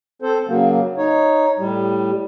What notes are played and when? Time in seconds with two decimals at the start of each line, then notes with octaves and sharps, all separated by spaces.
0.22 C4 A4 C5
0.48 C#3 F#3 A#3
0.97 D#4 C#5
1.58 A2 G3